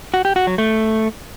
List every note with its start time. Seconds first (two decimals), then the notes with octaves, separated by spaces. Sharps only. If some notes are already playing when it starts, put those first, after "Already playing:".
0.14 F#4
0.25 G4
0.36 F#4
0.47 F#3
0.58 A3